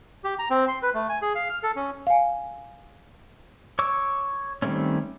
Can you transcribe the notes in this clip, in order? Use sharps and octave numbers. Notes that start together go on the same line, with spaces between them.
G4
A#5
C4
C6
B4
A3
G#5
G#4
F5
F6
A4
C#4
F5 G#5
C#5 C#6 D6 E6
D#3 G3 A3 C4 C#4